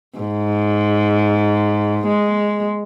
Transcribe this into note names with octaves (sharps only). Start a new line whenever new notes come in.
G#2
G#3